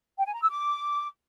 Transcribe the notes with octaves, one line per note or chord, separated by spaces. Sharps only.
G5
G#5
A#5
E6
D6